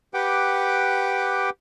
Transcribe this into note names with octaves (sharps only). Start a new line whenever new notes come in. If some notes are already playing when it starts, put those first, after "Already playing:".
G4 B4 F#5 G5 D6